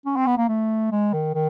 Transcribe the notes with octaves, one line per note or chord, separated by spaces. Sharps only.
C#4
C4
B3
A#3
A3
G#3
D#3
D#3